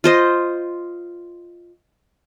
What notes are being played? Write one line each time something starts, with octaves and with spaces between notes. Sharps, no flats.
F4 C5 D#5